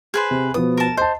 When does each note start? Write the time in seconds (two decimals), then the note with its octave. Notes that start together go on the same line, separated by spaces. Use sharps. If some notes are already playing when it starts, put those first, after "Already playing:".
0.14 G#4 B4 C5
0.31 C3
0.54 B2 F3 B3 D#6
0.77 A#4 A5
0.97 C5 D#5 A5